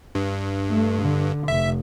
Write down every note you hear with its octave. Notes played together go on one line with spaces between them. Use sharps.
G2
A3
D3
F1 E5